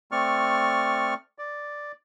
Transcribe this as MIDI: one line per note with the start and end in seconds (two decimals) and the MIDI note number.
0.12 1.14 57
0.12 1.14 60
0.12 1.14 74
0.12 1.14 85
0.12 1.14 89
1.38 1.92 74